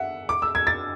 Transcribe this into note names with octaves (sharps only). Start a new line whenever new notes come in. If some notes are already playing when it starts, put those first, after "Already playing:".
Already playing: E5 F#5
D6
E6
G#6
A6